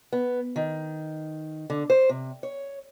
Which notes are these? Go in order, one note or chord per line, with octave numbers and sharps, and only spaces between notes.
B3
D#3
D3
C5
C3
C#5